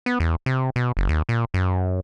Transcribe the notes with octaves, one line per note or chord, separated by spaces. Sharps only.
B3
E2
C3
B2
F#1
D#2
A#2
F#2